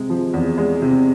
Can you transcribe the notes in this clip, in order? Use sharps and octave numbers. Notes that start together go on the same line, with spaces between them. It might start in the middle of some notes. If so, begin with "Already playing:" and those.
Already playing: C3 G#3
F3
E2
G#3
C3